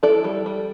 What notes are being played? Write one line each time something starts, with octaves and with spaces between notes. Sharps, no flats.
E4 A4 D5
G3
G3